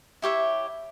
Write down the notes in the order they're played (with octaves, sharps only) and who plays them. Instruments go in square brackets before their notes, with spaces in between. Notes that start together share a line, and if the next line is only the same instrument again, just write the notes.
[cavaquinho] E4 G4 C#5 E5